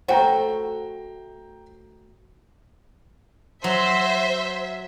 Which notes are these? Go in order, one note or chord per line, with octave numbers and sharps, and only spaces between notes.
A3 F#4 C5 G5 A#5
F#3 C5 E5